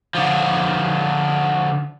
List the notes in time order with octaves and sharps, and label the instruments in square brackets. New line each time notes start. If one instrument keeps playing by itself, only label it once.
[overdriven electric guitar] D3 F3